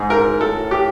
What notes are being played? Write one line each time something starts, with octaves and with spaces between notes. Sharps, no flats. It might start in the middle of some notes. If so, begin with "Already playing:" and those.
Already playing: G#2 G#4
A#4
A2 A4
G4